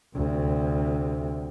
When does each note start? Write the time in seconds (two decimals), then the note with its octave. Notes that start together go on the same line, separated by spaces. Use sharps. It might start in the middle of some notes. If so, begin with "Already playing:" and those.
0.15 D2 C3